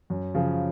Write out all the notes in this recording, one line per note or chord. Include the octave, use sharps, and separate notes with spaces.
F#2
C#3 F3